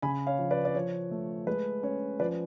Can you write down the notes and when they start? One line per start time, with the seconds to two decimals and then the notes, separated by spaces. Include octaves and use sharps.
0.02 C#3 G#5 B5
0.27 C#5 F5
0.39 F3
0.51 B4 D5
0.65 D5
0.75 F3 C#5
1.11 A3
1.47 G#3 B4
1.83 C#4 C#5
2.20 F3 B4 D5